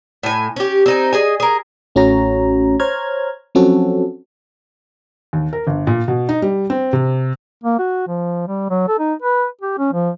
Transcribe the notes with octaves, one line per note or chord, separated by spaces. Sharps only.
A2 G#5
C#4 G4
C4 D#4 G#5
G#4 D#5 G#5
G#4 A#4
A1 A3 C#4 F#4 C#5 A#5
C5 C#5 A#5 F6 G#6
F3 F#3 C4 C#4 F#4 A4
D#2
A#4
G1
A#2
B2
D#4
G3
C4
C3
A#3
F#4
F3
G3
F#3
A4
D#4
B4
G4
C#4
F3